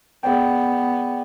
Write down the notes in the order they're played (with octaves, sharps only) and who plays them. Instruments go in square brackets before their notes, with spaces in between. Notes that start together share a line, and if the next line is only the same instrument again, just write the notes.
[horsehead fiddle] B3 [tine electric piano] G#4 D5 G5